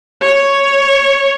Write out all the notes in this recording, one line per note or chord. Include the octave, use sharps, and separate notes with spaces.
C#5